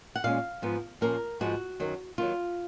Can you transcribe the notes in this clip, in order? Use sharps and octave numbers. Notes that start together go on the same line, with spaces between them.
F#5
A#2 G#3 C#4 F5
G#2 F3 B3
A#2 F3 A#3 C#4 A#4
G#2 F3 G#3 B3 F#4
F#2 D#3 F#3
D#2 D#3 F#3 F4